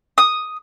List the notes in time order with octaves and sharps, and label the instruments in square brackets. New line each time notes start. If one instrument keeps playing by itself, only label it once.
[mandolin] D#6